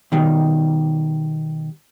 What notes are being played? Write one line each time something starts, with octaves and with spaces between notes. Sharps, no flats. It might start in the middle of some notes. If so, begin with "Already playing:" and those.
B2 D#3 G3